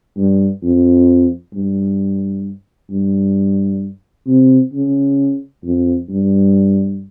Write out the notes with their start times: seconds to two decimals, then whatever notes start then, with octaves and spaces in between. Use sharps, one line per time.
0.17 G2
0.62 F2
1.53 G2
2.91 G2
4.27 C3
4.73 C#3
5.64 F2
6.09 G2